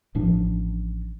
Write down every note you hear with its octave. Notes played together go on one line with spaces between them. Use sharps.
A1 A2 F3 D4